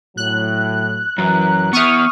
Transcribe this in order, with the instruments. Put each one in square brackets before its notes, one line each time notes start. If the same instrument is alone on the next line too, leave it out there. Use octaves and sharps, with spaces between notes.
[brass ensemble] A2 F#3 [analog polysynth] F#6
[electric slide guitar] F#2 [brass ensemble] E3 A#5
[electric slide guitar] B3 E5 [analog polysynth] C#6 D#6 F6